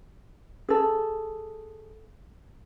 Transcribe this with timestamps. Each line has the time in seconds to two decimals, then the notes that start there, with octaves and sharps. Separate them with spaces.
0.69 G#4 A4